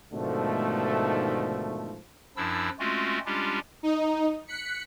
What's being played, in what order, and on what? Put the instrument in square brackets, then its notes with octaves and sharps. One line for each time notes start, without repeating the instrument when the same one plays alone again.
[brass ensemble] G#2 B2 D3 D#3 F3 A3
[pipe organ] F#2 F3 D4 E4 E6
G#3 A3 C4 C#4 F4 F#4
G3 G#3 C#4 D4 F4 G4
[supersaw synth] D#4
F#6 B6 C#7